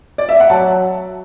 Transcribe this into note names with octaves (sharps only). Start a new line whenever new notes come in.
D5
E5
F#5
F#3 A5